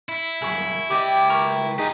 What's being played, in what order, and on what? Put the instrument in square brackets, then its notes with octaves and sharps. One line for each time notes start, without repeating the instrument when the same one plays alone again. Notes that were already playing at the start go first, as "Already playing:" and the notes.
[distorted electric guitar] E4
[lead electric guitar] C2 F#2 [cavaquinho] G#4 C#6
[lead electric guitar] C#2 G5 [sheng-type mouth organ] G4 [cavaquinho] D5 D#5
[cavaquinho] A#4 C#6
[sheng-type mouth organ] D#4 G#4 [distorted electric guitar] G4 D#5